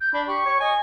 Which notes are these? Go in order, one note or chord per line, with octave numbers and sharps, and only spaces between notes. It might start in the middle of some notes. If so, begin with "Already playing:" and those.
G6
D4 B5
G4 C#6
C#5
D#5 G#5